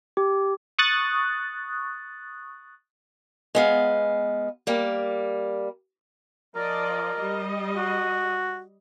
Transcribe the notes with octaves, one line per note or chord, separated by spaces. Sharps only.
G4
C#6 D#6 F#6 A6
G#3 B3 F5
G3 A#3
F3 A#4 D5 D#5
G3 D#5
F#4